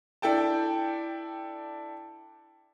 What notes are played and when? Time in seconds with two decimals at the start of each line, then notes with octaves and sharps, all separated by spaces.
0.22 D4 E4 A4 G5 A5